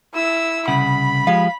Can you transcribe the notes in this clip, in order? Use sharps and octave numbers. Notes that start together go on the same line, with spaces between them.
E4 E6
C2 C#3 F#5 B5
F3 G#3 G4 F5